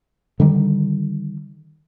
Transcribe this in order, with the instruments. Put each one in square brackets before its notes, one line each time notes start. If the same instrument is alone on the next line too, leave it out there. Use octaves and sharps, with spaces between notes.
[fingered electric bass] D3 D#3 G3